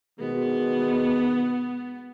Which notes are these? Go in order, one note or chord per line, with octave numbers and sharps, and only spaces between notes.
B2 D#3 G#3 B3